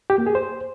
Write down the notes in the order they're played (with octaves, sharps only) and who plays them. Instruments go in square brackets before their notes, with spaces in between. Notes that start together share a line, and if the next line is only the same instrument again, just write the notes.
[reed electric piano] G4
A#3
G#4
C5